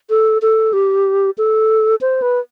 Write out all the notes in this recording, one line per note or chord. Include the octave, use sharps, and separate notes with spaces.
A4
A4
G4
A4
C5
B4